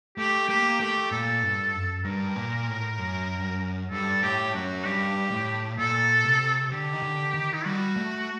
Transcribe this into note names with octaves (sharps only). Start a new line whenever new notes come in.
A3 G4
A#3 G4
A3 G4
A#2 A4
G2
F#2
G2 A#4
A#2
A2
F#2
G2 A4
A2 G4
F#2 F#4
G2 G4
A2
A#2 A4
C3
D3 G4
D#3
D3
D#3
D#4
G3 F#4
A3